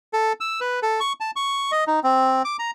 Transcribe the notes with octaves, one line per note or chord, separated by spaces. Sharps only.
A4
E6
B4
A4
C#6
A5
C#6
D#5
D#4
C4
D6
A#5